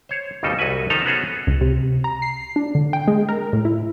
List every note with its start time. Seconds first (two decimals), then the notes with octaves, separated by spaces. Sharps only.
0.09 C5 C#5
0.43 G#1 D#2 C#3 G3 D#4 A4
0.59 C2 F#3 F#4 B4 G#5
0.90 D#3 F3 D#4 A4 E5 A#5
1.06 B3 C#4 F#4 G#4 A4 C#5
1.47 C#2
1.61 C3
2.04 A#5
2.22 C7
2.56 D4
2.75 D3
2.93 G5
3.08 G#3
3.29 A#4
3.53 A2
3.65 E4